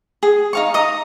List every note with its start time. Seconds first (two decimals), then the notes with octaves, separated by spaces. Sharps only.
0.23 G#4
0.53 D#4 F5 C#6
0.74 D#5 A#5 D#6